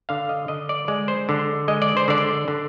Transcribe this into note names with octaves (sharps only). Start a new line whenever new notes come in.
D3 F5
D#5
D3 D#5
D5
G#3 D5
C5
D3
G#3 D#5
D5
C5
D3 D5
D3